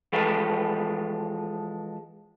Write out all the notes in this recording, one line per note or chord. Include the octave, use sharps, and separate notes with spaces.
E3 F3 G#3 A4 B4